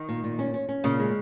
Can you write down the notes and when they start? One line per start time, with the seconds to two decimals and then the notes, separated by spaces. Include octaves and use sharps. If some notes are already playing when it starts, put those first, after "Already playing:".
Already playing: D#3
0.09 A#2
0.24 A#2
0.39 C#4
0.54 C#4
0.69 C#4
0.84 A#2 C#3
0.99 G#3